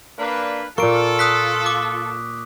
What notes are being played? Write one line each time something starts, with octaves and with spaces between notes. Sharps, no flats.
A#3 D4 B4
A#2 A#3 F4 A4 C#6 D7
D#6 F#6 B6
D6